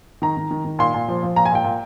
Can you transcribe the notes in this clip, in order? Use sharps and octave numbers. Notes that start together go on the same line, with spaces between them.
D#3 A#5
D#3
D#3
D#3
A#2 C6
A#2
F3
F3
A#2 A#5
G#5
A#2 G5
A#2